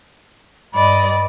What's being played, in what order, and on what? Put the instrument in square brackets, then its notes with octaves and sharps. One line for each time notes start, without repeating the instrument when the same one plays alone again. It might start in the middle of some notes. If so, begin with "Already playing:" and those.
[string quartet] G2 D5 D#5 [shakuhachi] B5